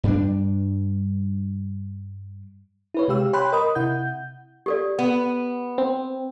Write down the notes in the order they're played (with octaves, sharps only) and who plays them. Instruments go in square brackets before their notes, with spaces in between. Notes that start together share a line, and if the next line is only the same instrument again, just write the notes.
[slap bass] G2 G3 D4
[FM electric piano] E4 B4 C#5
C3 G#3 G4 F5 E6
C#5 G5 B5 C6 F#6
A#4 D#5 B5 D#6
C3 E4 F#5 G6
[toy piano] G4 A4 D5
[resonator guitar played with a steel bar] B3
[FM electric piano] C4